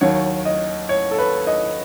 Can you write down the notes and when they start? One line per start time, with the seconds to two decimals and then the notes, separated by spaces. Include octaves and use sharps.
0.01 D#2 D#3 F#3 C#5
0.45 D#5
0.89 C#5
1.11 A4
1.18 B4
1.47 D#5